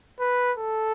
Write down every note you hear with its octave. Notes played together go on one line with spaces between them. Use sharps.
B4
A4